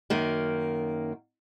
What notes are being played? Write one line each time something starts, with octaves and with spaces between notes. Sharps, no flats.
F#2 D#3 A#3